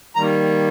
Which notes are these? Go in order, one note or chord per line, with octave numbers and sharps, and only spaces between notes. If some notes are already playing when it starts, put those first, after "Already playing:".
D#3 G3 A#3 A#5